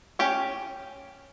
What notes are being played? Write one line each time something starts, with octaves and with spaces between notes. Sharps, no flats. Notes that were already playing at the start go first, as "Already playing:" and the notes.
C#4 G4 C#5